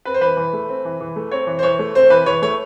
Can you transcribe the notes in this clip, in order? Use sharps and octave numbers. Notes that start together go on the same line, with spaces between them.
C4 B4
C5
E3 B4
E3
A3
C4
E3
E3
A3
C4 C#5
E3
C5
E3 C#5
A3
C4 C5
E3 B4
E3 C#5
A3 C#5